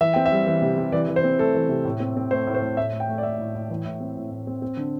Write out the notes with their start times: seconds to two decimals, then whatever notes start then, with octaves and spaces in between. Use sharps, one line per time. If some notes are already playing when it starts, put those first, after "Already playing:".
0.01 E3 E5
0.14 C4 G5
0.26 E5
0.32 G3
0.47 E3
0.62 C3
0.77 C3
0.92 E3 D5
1.09 E3
1.16 C5
1.24 C4
1.39 A3 A4
1.55 E3
1.69 C3
1.85 A2
2.00 C4
2.17 C4
2.31 A3 C5
2.47 A2
2.54 C5
2.62 A2
2.77 A2 E5
2.93 A3
3.00 G5
3.09 A3
3.18 D5
3.23 A3 E5
3.39 A2
3.55 A2
3.70 E3
3.85 A2
4.00 C4
4.17 A2
4.31 A2
4.47 C4
4.62 C4
4.77 D3